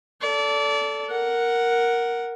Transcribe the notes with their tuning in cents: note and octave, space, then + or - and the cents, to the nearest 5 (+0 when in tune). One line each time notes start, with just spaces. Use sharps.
A4 +0 D5 -30
A#4 +0 F#5 +0